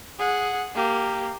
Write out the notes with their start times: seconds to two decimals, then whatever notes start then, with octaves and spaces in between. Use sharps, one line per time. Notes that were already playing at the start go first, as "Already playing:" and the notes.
0.18 G#4 F#5
0.74 A#3 G4